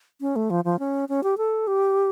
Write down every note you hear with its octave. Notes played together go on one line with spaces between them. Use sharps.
C#4
A3
F3
F3
C#4
C#4
G4
A4
G4